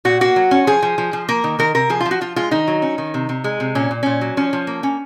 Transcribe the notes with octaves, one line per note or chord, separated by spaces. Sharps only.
A#2 F#4
A#3 F#4
F#3
C#4
F3 G#4
F3
F3
F3
A#3 A#4
D#3
D#3 A#4
C3 A#4
F3 G#4
F4
F3
F#4
F3 F4
G#3 F4
D#3 D#4
F#3
C#4
D#3
C3
C3
G#3
C3
A#2 C#4
A#2
A#2 C#4
F#3
F3 C#4
F3
A#3
C#4